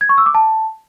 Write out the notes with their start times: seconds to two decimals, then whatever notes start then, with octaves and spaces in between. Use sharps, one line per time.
0.01 G#6
0.09 C#6
0.18 E6
0.26 D6
0.34 A5